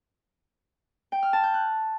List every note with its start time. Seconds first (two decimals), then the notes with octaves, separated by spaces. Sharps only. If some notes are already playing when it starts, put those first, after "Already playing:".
1.12 G5
1.23 F6
1.33 A5
1.43 G6
1.54 F#6